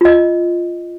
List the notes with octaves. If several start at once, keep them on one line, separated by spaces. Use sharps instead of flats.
F4 D#5